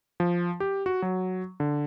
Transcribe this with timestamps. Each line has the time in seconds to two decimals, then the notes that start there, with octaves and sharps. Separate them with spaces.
0.20 F3
0.60 G4
0.86 F#4
1.02 F#3
1.60 D3